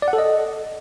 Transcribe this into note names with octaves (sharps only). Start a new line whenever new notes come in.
D5
F#5
A4
D#5